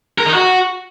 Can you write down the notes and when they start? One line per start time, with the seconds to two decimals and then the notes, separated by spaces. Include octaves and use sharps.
0.18 A#4
0.26 D#4
0.34 F#4